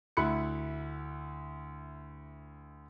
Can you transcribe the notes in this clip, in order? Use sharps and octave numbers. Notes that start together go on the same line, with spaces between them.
D2 E4 B5 F#6 C#7